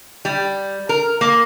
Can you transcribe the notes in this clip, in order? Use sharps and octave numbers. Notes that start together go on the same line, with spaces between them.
G3
A#4
A#3